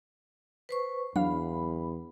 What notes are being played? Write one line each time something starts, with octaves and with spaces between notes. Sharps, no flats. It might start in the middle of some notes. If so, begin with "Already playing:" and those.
B4 C5 C#6
E2 F#3 D4 F5 B5